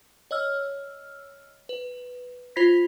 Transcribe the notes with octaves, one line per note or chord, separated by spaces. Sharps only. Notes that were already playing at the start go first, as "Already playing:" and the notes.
C#5 D#5 E6 F6
B4
F4 C5 B5 G#6 A#6 B6